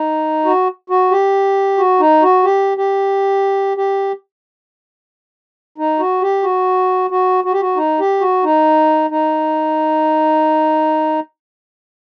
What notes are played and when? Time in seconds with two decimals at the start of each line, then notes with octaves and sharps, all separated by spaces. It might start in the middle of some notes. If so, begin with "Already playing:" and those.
Already playing: D#4
0.45 F#4
0.90 F#4
1.12 G4
1.78 F#4
2.00 D#4
2.22 F#4
2.44 G4
2.78 G4
3.77 G4
5.78 D#4
5.99 F#4
6.22 G4
6.43 F#4
7.10 F#4
7.44 F#4
7.53 G4
7.61 F#4
7.76 D#4
8.00 G4
8.21 F#4
8.44 D#4
9.10 D#4